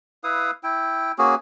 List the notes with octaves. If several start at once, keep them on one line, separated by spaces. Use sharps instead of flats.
E4 B4 F5 D#6
E4 G5
A#3 C#4 F#4 G#4